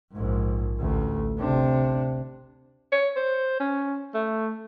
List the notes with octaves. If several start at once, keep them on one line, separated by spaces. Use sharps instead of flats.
A#1 G#2
A1 D2
C3 D4
C#5
C5
C#4
A3